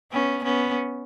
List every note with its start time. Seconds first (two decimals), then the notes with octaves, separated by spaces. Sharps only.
0.12 B3 C#4
0.44 B3 C#4